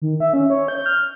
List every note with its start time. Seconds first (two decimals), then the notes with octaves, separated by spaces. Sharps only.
0.02 D#3
0.20 E5
0.33 C#4
0.50 C#5
0.68 G6
0.86 F6